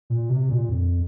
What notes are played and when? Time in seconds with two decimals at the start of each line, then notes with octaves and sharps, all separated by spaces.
0.10 A#2
0.30 C3
0.49 A#2
0.69 F2